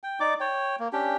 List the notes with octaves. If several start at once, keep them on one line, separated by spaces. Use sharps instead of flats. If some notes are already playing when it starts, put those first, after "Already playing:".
G5
D#4 D5 D6
C#5 G5
A#3
C#4 D4 G4 G5